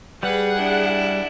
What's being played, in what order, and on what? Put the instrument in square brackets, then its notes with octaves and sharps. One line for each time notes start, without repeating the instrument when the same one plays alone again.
[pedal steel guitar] G3 [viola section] G#4 F#5 [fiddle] B4
[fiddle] D4 E4